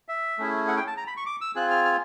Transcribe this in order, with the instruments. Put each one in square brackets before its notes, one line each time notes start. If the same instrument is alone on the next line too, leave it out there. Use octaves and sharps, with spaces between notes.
[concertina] E5
A3 C#4 E4 G#4
F#5
G5
A5
A#5
B5
C#6
D6
E6
C4 F4 G#4 F#6
F6
F6